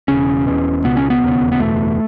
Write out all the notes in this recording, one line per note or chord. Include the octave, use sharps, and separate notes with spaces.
E1 D#2 C#3 C#4
E1 E2 B2
C#2 B2 B3
C#4
B3
E1 D#2 C#3
B3
F#1 E2 B2 A3